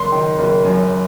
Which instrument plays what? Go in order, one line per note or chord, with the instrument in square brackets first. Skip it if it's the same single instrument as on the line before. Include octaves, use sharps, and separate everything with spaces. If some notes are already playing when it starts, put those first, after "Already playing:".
Already playing: [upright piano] F#1 C6
D#3
F#1
F#2